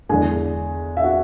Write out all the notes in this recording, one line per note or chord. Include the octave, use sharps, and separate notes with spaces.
E2 D3 G#3 G#4 G#5
E5
F#4 F#5